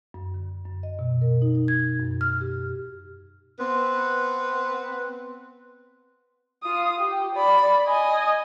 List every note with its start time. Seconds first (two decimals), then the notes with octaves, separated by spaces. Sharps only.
0.14 F#2
0.34 D3
0.65 F#2
0.83 D#5
0.99 B2
1.21 A#4
1.42 D#4
1.55 D#4
1.68 G#6
2.00 F#2
2.21 F6
2.41 G4
3.59 B3 C4 B4
6.63 F4 D#6
7.00 G4
7.36 D5 B5
7.88 D#5 G#5